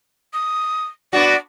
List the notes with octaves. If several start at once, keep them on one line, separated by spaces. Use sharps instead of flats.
D#6
B3 D4 F#4 D5